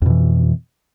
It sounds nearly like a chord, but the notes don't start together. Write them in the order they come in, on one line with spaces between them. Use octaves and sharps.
F2 B2 E3